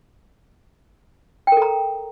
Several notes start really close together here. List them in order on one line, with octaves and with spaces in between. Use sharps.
G5 A#4 A4 A#5